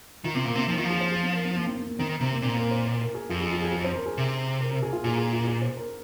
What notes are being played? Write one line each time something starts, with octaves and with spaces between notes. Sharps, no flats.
D#3 F4
C3 C4
A#2 A#3
C3 C4
F3 D#4
D#3 F4
F3
G#4
C5
G#4
C4
A#4
C4
A#3
C4
C4
A#3
D#3 C4
C3 C4
A#3
A#2 C4
A#4
C5
C5
A#4
G#4
F2 F4
G#4
F4
G#4
G#4
C5
A#4
G#4
C3
A#4
A#4
G#4
F4
A#2 G#4
G#4
F4
G#4
C5
A#4